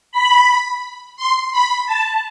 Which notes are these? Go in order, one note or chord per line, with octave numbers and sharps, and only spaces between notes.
B5
C6
B5
A5